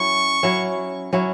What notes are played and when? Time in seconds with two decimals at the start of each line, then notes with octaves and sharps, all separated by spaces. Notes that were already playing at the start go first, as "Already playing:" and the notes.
Already playing: F#3 C#4 E4 C#6
0.43 F#3 C#4 E4
1.13 F#3 C#4 E4